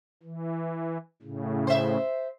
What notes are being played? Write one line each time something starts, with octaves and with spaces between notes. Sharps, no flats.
E3
A2 C#3
C5 E5